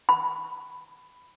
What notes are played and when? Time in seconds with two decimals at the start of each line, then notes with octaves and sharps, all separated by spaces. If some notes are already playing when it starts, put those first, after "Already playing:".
0.09 B5